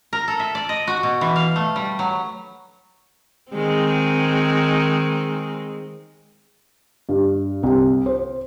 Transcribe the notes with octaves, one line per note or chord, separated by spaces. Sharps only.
A#4
A4
E5
D5
D#5
F#4
B2
E3
F5
A3
G3
F#3
D#3 G#3 C4
G2
C2
C5